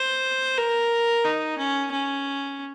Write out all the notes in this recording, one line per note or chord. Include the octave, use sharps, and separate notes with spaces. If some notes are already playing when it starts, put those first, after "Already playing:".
Already playing: C5
A#4
D#4
C#4
C#4